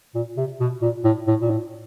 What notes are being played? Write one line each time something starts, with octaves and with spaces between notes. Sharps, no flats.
A#2
C3
B2
A#2
A2
A2
A#2
A2